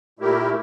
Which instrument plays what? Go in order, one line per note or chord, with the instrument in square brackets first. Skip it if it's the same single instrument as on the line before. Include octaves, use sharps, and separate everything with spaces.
[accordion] A#2 A3 E4 G4 A#4